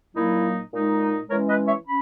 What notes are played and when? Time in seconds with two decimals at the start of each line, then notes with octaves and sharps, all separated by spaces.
0.15 A#2 F#3 A#3 D#4 E4
0.73 A#2 G#3 D#4
1.29 E3 G#3 C#4 A#4 C#5
1.48 B4 D#5
1.67 C#5 E5
1.86 C#4 B5